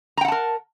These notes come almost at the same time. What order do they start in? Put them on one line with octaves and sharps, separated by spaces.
A#5 G5 F#5 A5 A#4